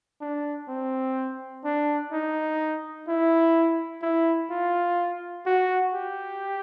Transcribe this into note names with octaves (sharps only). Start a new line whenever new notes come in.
D4
C4
D4
D#4
E4
E4
F4
F#4
G4